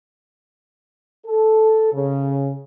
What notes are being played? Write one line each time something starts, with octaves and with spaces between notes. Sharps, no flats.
A4
C#3